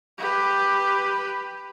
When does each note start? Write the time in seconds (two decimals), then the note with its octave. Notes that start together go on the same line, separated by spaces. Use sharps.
0.18 G4 B4